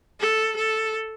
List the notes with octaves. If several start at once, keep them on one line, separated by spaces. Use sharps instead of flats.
A4
A4